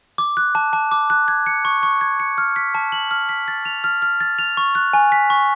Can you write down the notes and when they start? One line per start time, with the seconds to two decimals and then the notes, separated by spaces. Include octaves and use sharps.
0.18 D6
0.37 F#6
0.55 A5
0.73 A5
0.91 D6
1.10 F#6
1.28 G#6
1.46 C#7
1.65 C#6
1.83 C#6
2.01 G#6
2.20 C#7
2.38 F6
2.56 B6
2.75 A5
2.92 F#7
3.11 F6
3.29 B6
3.48 A6
3.65 F7
3.84 F6
4.02 F6
4.21 A6
4.39 F7
4.57 C#6
4.75 F#6
4.93 G#5
5.12 B6
5.30 C#6